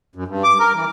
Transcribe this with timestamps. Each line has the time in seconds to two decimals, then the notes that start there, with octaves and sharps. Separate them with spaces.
0.16 F#2
0.28 G2
0.44 D6
0.60 A#4
0.74 E3